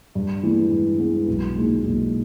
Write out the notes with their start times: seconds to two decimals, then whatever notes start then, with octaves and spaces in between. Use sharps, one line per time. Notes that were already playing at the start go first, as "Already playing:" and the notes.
0.15 G2
0.43 E3 G#3 B3
0.71 G2
0.99 E3 G#3 B3
1.28 B1
1.56 A#2 G#3 D#4
1.84 B1